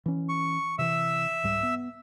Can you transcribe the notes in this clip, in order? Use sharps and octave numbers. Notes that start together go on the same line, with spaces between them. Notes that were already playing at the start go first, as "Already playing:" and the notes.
E3 C#4
C#6
C3 E3 E5 E6
C2 G#2 G3
B3